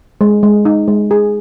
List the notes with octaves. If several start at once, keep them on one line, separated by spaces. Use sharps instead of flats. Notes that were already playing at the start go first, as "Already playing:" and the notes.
G#3
G#3
D#4
G#3
G#4